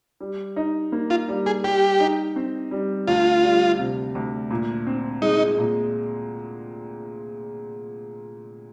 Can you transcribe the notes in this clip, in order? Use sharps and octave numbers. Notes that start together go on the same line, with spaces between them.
G3
D#4
A#3
F4
G3
G#4
G3 G4
D#4
C4
G3
D2 F4
G3
C3
D2
A#2
C4
G#3 D#4
A#2